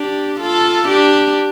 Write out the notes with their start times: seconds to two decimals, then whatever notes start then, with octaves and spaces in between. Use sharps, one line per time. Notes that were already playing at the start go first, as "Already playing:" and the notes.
Already playing: D4 G4
0.40 F4 A4
0.88 D4 G4